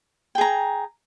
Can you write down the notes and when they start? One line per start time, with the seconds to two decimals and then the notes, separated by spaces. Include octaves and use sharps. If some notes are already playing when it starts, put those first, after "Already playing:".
0.35 G5
0.38 G#4
0.41 A#5